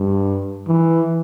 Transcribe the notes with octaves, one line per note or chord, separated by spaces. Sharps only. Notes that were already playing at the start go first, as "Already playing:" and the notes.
Already playing: G2
E3